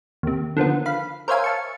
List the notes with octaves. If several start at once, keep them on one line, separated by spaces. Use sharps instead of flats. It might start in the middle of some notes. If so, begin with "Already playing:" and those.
D#2 C3
D3 D#3 F3 B3
F5 B5
A#4 C5 C#5 E5 F5 G#5
F5 A5 C#6